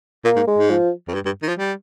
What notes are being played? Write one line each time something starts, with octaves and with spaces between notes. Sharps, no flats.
A#2 A#3
G#2
G#3
G#2
F3
F2
G2
G2
D#3
F3
G3